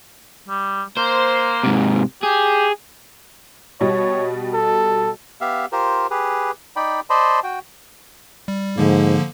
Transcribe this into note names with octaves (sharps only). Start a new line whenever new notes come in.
G3
A#3 C5
G#2 C3
G4 G#4
B2 G3 C#5 D#5
A4
B3 G4 E5 F5
F4 G4 A#4 C5
G4 G#4 B4
D#4 D5 G5 B5
C5 D5 D#5 A5 B5 C6
F#4 G5
G3
G#2 D3 F3 A#3